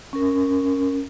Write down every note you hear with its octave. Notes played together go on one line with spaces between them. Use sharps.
C#4 A#4